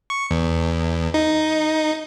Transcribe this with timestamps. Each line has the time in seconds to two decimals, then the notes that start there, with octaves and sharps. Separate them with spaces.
0.10 C#6
0.31 E2
1.14 D#4